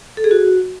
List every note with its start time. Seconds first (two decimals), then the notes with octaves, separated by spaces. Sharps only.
0.17 A4
0.24 G#4
0.31 F#4